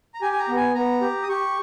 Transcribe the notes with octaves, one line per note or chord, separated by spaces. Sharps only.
A#5
G4 G#5
G#5
A#5
B3
G#5
B3 A#5
G4
D#6
G4 C#6